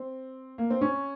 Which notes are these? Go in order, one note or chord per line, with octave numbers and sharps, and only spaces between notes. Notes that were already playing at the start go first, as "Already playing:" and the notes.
Already playing: C4
A#3
C4
C#4